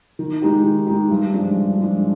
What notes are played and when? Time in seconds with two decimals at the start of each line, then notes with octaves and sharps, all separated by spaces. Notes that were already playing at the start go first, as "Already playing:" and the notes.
0.19 D#3
0.42 G#3 D#4 G4
0.64 D#3
0.87 G#3 D#4 G4
1.10 G2
1.33 F3 G#3 D4
1.55 G2
1.79 F3 G#3 D4